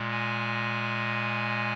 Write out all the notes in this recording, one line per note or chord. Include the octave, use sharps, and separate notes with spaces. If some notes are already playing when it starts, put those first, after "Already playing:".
Already playing: A#2 G#3
G#5